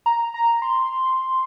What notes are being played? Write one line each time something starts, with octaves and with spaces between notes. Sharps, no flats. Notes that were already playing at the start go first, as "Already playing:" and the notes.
A#5
A#5
C6